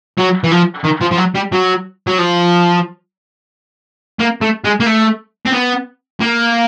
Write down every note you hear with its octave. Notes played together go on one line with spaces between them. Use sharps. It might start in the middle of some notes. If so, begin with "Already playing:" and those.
F#3
E3
F3
D#3
F3
F3
F#3
G3
F#3
F#3
F3
A#3
A3
G#3
A#3
A3
C4
B3
A#3